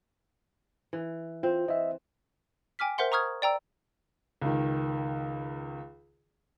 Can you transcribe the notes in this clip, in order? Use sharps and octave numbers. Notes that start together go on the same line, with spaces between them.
E3
C4 F4
E3 D#5 E5
G5 G#5 D6 F6 B6
A#4 C5 E5 F#5 C6
A#5 C#6 D#6 F6 G#6
D5 G5 A#5 E6
C#2 D#3